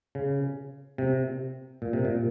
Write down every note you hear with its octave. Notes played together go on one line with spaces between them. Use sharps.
C#3
C3
A#2
C3
A#2